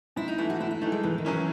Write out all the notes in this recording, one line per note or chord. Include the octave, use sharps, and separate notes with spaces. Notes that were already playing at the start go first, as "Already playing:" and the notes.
G#2 E4
D#4
E3 A3 E4
F#4
G#2 E4
E4
E3 A3 D#4
G#3
G#2 E3
D#3
F#3 C#4 E4
E3